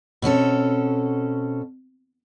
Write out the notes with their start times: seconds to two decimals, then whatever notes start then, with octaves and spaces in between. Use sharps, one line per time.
0.22 B2 C4 C#4 A4